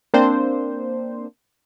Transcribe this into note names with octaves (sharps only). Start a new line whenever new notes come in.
A#3 C4 D4 C5